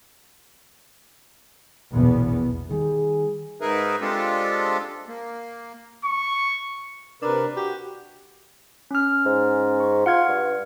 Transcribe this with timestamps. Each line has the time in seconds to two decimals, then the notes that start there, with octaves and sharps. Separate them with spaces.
1.93 A#1 E2 B2 B3
2.71 D#3 G3 G#4
3.61 G#2 D#4 G#4 A#4 B4 E5
4.01 G#3 C4 D4 F4 G4 A4
5.08 A#3
6.05 C#6
7.22 C3 D4 A#4 B4
7.57 F#4 G4
8.91 C#4 F6
9.25 G#2
9.80 C#6
10.06 F4 F#5 F6 G#6
10.29 G2